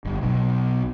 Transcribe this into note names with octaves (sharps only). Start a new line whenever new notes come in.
G1
B1